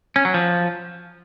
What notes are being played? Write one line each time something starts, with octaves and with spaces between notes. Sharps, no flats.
C#4
F#3
F3